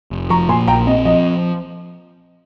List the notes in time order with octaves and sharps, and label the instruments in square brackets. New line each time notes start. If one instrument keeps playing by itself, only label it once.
[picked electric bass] F1
[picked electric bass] F3 [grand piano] A#5 C#6
[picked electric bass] A#2 [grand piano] G#5 C6
[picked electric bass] A#1 [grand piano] G5 A#5
[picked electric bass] C4 [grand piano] D#5
[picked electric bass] F3 [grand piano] D#5